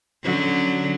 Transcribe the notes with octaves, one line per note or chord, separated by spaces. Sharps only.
D3 F#3 C#4